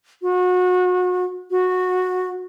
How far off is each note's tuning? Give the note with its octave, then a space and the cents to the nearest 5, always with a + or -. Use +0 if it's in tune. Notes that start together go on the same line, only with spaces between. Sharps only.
F#4 -30
F#4 -15